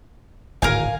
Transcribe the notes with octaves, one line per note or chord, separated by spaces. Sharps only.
D1 G#1 A#4 F5 G#5